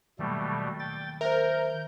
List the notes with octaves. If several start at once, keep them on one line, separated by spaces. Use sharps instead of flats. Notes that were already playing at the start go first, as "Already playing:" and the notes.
B2 D#3 F#3 G3 A3 A#3
G5 A6
A#4 C5 E5 G6